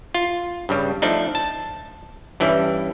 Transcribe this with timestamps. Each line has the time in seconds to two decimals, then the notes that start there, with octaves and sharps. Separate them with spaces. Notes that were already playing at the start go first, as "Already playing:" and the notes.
0.14 F4
0.69 G2 C#3 G3
1.02 F3 A3 D4 D#4
1.35 A5
2.40 G2 E3 G3 C#4 E4